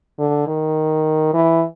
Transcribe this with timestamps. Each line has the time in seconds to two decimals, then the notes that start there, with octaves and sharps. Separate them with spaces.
0.19 D3
0.47 D#3
1.34 E3